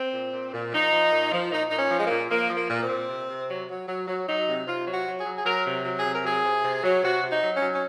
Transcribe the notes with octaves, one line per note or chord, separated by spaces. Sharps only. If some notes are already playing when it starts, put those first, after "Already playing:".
Already playing: C4
A#2
A#2
A#2
F3 D#4
F3
A#2
F3
A#2 D#4
A#2 D#4
C#4
F3
G#3
A#3
A#2
F3 A#3
F3
A#3
A#2
A#3
C4
A#2
C3
C3
F#3
F#3
F#3
F#3
F#3 D#4
C3
C3 F4
F#3
F#4
F#3
G#4
F#3
G#4
F#3 A#4
C3
F#3
G#4
C3
A#4
F#3 G#4
C3
C3
F#3
C3 F#4
C3
D#4
F#3
C#4
F#3
C#4